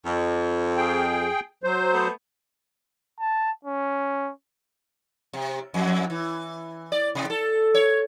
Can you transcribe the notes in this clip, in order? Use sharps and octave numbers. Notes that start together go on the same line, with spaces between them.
F2
G#4 G5
F#3 C5
A3 B3
A5
C#4
C3
F2
E3
D5
C3
A4
C#5